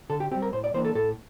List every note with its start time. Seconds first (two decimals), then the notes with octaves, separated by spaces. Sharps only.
0.10 D3 A4
0.20 G4
0.31 C4 G4
0.35 G3
0.42 A#4
0.53 A2 C5
0.64 D5
0.74 E3 A#3 D4 C5
0.85 A4
0.95 A2 A4